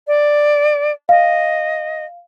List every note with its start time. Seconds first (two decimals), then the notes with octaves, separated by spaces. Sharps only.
0.07 D5
1.09 D#5 F5